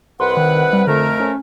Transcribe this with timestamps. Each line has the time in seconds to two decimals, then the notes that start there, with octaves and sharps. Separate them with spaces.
0.20 C2 B4 F#5 C6
0.37 D#3
0.73 G3
0.87 F2 D3 A3 A#4
1.20 C#4